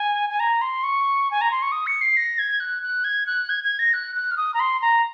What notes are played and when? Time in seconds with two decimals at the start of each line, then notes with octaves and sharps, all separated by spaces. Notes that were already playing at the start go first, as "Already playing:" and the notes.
Already playing: G#5
0.29 G#5
0.40 A#5
0.61 C6
0.83 C#6
1.31 G#5
1.41 A#5
1.51 C6
1.62 C#6
1.72 D#6
1.87 C#7
2.01 C7
2.17 A#6
2.39 G#6
2.60 F#6
2.83 F#6
3.04 G#6
3.26 F#6
3.49 G#6
3.64 G#6
3.79 A#6
3.93 F#6
4.15 F#6
4.31 F6
4.37 D#6
4.54 A#5
4.60 C6
4.82 A#5